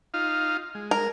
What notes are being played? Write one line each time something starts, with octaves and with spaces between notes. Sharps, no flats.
D#4 F4 F5
G#3
A#4